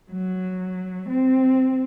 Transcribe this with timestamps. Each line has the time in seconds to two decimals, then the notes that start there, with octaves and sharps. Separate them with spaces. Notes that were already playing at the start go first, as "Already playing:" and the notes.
0.11 F#3
1.09 C4